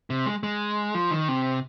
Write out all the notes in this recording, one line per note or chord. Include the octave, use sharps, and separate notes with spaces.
C3
G#3
G#3
F3
D#3
C3